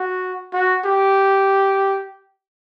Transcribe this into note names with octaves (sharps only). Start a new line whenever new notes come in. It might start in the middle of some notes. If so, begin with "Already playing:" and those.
Already playing: F#4
F#4
G4